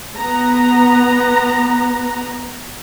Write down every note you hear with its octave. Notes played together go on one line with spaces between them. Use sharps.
B3 A#5